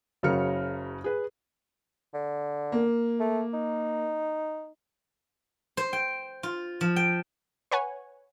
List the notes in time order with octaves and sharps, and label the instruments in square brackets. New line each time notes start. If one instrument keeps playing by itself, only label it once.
[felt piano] F#1 C#3 F#3 A#4 F6 C#7
G#4 B4
[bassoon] D3
[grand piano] A#3
[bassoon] A3
D#4
[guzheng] C5
G5
F4
F3
G5
[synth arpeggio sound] B4 C#5 F#5 G#5